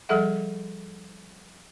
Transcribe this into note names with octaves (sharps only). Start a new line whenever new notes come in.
F3 G3 G#4 A4 E5 F#5